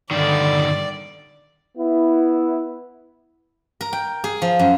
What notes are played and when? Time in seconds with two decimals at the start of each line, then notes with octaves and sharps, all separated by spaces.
0.11 G2 D3 D#3 D5
1.77 B3 E4
3.81 A#4
3.93 G5
4.24 G#4
4.42 F3
4.59 F#2